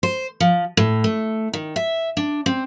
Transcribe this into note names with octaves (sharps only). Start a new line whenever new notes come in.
C5
F3
A2
A3
D#3
E5
D4
C4